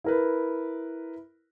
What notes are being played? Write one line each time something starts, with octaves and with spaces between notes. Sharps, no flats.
E4 A#4 B4